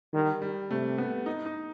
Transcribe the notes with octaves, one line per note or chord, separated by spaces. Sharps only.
D#3 G3
G3
C3 A3
B3
D#4
D#4